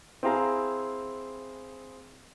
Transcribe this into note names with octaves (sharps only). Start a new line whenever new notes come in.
C4 E4 G#4 F5 A#5